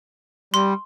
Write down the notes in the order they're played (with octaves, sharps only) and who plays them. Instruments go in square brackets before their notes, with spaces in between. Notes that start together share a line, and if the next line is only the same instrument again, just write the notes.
[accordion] G3 [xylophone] C6